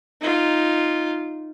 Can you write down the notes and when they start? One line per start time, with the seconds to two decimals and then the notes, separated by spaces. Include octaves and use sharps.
0.21 D#4 F4